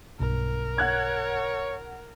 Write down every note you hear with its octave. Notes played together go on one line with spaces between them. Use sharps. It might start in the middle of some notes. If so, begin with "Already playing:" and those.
B1 G2 A#4
C#5 F#5 F#6 G#6